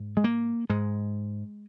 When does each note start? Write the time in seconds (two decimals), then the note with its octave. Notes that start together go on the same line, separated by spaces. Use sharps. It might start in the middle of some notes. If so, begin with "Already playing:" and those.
Already playing: G#2
0.17 G#3
0.24 A#3
0.69 G#2 G#3